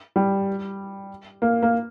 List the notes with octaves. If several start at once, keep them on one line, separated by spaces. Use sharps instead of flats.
G3
A#3
A#3